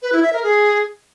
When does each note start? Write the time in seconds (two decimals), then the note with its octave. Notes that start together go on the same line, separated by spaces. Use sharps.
0.02 B4
0.12 E4
0.23 E5
0.33 A#4
0.43 G#4